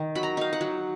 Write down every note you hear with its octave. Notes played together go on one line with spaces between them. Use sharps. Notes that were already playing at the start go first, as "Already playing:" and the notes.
Already playing: D#3
F#3 B5
A#5
D#4 F5
F#5
F#3